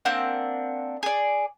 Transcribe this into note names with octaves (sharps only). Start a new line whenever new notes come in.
A#3 C4 D4 F#5
G#4 D5